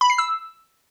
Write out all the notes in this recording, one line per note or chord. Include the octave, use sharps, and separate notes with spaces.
B5
C7
E6